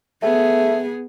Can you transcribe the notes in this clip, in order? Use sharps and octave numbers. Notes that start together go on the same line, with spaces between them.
A3 B3 G#4